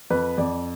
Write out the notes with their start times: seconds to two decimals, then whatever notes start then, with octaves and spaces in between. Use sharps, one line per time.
0.10 F2 B4
0.38 F2 D5